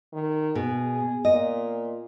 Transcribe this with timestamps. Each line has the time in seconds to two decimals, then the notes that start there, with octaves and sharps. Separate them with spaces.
0.13 D#3
0.55 B2 G#4
1.25 A#2 D#5